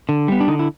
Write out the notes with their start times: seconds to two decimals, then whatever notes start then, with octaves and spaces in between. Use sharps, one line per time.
0.09 D3
0.28 G3 B3
0.40 D4
0.48 D3 D#4
0.59 E4